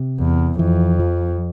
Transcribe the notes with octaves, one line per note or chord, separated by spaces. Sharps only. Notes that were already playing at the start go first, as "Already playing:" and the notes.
Already playing: C3
E2
F2 E3
F3